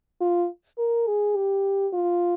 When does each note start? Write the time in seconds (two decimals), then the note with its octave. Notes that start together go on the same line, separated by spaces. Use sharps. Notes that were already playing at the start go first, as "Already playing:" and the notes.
0.21 F4
0.78 A#4
1.07 G#4
1.36 G4
1.93 F4